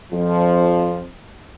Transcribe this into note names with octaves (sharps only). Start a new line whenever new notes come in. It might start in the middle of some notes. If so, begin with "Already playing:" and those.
F2 F3